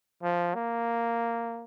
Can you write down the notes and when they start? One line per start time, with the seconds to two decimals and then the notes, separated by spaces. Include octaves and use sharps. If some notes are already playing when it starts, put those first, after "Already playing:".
0.23 F3
0.55 A#3